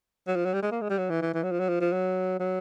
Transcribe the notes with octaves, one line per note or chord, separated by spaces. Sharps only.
F#3
F3
F#3
G3
G#3
A#3
G#3
G3
F#3
E3
E3
E3
F#3
F3
F#3
F3
F3
F#3
F#3